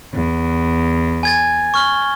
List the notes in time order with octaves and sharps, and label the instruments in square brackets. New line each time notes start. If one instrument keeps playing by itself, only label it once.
[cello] E2
[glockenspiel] G#5 G#6 A6
C#6 F6 G7